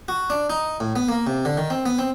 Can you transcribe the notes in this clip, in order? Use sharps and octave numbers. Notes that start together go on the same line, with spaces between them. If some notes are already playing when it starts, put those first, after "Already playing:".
F#4
D4
D#4
A2
B3
A#3
C3
D3
D#3
C4
B3
C4